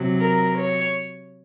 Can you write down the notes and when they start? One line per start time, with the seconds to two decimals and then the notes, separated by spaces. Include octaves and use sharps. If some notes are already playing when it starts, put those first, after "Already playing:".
Already playing: C3 F#3
0.20 A#4
0.58 C#5